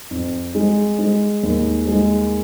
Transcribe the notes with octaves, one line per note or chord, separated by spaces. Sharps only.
F2
G#3
G#3
D#2
G#3